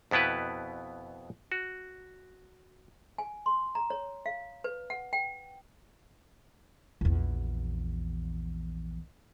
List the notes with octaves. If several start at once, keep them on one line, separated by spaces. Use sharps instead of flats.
F2 B2 B3 E4 B4
F#4
G#5
C6
A#5
C#5
F5
B4
F#5
G5
A#1 E2